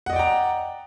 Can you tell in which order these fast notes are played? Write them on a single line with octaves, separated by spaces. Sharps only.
F#5 D#5 D5 G5 A#5